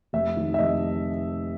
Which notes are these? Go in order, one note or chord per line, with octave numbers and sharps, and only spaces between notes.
F1 E5
D#3
E5
F1 D#5